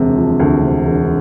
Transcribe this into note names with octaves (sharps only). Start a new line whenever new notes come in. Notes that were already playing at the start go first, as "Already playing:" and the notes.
Already playing: E1 D2 C3
F3
D2
C3
E1